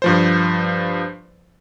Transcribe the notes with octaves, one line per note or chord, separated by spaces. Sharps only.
G2 F3 C5